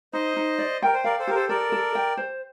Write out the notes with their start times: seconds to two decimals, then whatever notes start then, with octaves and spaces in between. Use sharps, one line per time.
0.13 D#4 C5 D#5
0.37 D#4
0.59 D5
0.82 A#4 G5
0.94 C5
1.04 A#4 D5 F5
1.19 A4 C5
1.27 G4 A#4
1.35 A4 C5
1.49 A4 A#4 D5
1.72 A4
1.95 G5
2.17 C5